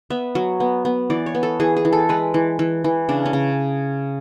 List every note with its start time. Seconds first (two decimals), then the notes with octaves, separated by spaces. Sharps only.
0.10 B3 E5
0.35 F#3
0.60 B3
0.85 B3
1.10 E3 D5
1.26 C#5
1.35 B3
1.43 A4
1.60 E3 G#4
1.77 G#4
1.85 E3
1.93 A4
2.09 G#3 B4
2.34 E3
2.59 E3
2.84 E3
3.09 C#3 D4
3.26 C#4
3.33 C#3